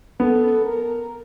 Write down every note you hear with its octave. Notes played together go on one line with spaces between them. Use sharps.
B3 A4
A#4